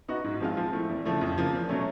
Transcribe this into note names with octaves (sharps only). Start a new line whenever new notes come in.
B3 D#4 F#4
G#2
F3 G#3 C4 F4
F3
A3 C4 E4
E2
C#3 F3 A3
F2
C#3 F3 A#3
E2
B2 F#3 A3 C#4